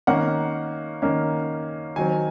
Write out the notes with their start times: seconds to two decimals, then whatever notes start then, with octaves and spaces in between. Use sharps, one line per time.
0.07 D#3 A#3 C#4 F#5
1.02 D#3 A#3 C#4
1.96 D#3 F#3 C4 G#5